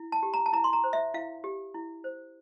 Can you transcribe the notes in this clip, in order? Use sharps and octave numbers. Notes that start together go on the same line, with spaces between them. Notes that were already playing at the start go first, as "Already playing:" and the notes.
Already playing: E4
A5
G4
A#5
A5
E4 A#5
C6
A#5
C5
E5
E4 F5
G4
E4
C5